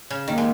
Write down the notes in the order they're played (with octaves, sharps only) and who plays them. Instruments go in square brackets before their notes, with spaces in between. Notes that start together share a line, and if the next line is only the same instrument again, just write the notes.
[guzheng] C#3
[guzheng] D#3 [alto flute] A#3
[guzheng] G#3